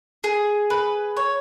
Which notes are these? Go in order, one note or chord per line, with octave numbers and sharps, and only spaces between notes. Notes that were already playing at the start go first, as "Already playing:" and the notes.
G#4
B4
C#5